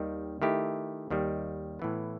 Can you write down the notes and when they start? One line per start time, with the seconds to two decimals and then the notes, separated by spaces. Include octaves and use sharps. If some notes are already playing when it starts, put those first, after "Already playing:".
Already playing: D#2 D#3 G3
0.42 D#3 A3 E4 G4
1.10 D#2 D#3 G3
1.79 A2 E3 B3